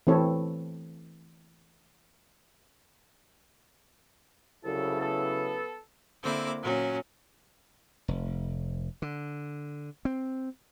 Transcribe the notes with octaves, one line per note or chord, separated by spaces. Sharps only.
E3 A3 C4 E4 A4 C#5
C2 C#3 F#3 E4 A4
B3 A4
D3 A#3 C4 E4 D6
A#2 F#3 C#4
F1
D3
C4